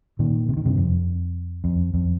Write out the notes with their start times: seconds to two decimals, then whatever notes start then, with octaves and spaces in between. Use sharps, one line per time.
0.19 A#2 D#3
0.49 C3
0.57 D#3
0.65 G2 C3
0.77 F2
1.64 F2
1.94 F2